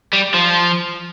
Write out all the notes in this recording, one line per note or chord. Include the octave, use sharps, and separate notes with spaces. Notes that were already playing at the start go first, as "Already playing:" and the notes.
G3
F3